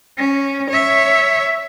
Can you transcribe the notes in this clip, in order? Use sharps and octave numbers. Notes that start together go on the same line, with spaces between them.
C#4
C#5 E5